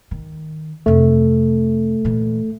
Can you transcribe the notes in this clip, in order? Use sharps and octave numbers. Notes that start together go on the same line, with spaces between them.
D#3
F2 C3 A3
A#2 E3